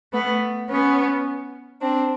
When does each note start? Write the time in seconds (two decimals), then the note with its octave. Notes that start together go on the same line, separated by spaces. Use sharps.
0.12 A3 B3
0.69 B3 C#4
1.81 C4 D4